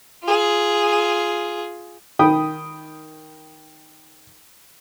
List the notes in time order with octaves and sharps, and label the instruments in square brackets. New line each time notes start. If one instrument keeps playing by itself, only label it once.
[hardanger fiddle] F4 G#4
[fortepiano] D#3 G5 B5 D#6